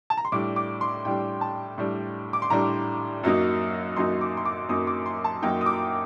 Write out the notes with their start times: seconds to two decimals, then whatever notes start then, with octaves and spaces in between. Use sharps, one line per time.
0.10 A5
0.17 A#5
0.25 C6
0.32 A2 G3 D4 D6
0.56 D6
0.81 C6
1.05 A2 G3 D4 G5
1.41 A5
1.78 A2 G3 D4
2.33 D6
2.42 C6
2.50 A2 G3 D4 A#5
3.23 F#2 F#3 A#3 D#4
3.96 F#2 F#3 A#3 D#4 C6
4.21 D6
4.37 C6
4.45 D6
4.69 F#2 F#3 A#3 D#4 D#6
4.87 D6
5.06 C6
5.24 A5
5.42 F#2 F#3 A#3 D#4 G5
5.61 D#6
5.66 D6